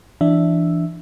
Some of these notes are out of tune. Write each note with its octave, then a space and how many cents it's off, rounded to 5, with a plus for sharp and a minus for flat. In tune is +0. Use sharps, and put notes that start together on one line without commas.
E3 +25 D4 +0 E5 +0